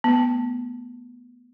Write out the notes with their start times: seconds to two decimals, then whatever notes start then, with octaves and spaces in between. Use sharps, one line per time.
0.04 B3
0.08 A3